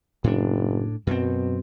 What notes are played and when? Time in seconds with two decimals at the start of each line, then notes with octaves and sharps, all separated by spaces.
0.24 F#1 A2 D4
1.07 F#2 B2 C4